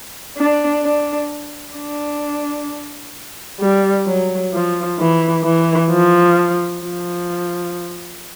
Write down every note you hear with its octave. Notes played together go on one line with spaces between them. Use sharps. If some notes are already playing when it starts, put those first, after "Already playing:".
D4
D4
D4
G3
F#3
F3
E3
E3
F3
F3